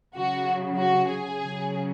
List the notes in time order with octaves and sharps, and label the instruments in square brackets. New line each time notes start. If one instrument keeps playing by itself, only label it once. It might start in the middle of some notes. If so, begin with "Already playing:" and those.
[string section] C#3 F#3 F#4
F#4
G#4
C#3 F#3